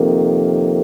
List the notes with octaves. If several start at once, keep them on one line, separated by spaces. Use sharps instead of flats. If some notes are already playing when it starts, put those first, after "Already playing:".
Already playing: F2 C3 D#3 A#3